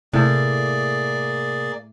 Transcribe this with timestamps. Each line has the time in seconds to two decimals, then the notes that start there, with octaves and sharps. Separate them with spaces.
0.13 A2 C3 A#3 G#4 D5